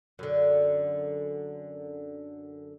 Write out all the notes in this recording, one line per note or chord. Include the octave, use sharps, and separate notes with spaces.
F#2 D3